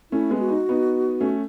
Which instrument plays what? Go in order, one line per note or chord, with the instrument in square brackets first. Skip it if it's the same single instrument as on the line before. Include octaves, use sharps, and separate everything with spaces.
[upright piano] A3 C#4 [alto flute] E4
[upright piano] G#3 B3
[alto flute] F#4
[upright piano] D#4
B3 D#4
A3 C#4